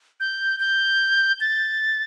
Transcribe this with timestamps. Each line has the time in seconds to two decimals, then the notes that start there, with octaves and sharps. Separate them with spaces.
0.20 G6
0.60 G6
1.41 A6